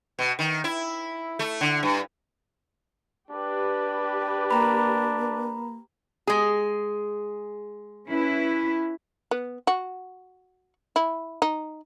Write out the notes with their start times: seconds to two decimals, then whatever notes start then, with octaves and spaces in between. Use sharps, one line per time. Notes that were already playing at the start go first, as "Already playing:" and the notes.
0.19 B2
0.39 D#3
0.64 E4
1.39 A3
1.61 D3
1.83 G2
3.31 D4 G4 B4
4.51 A#3 A#5 B5
6.27 G#3 G#4
8.08 C#4 E4 B4
9.31 B3
9.67 F#4
10.96 E4
11.42 D#4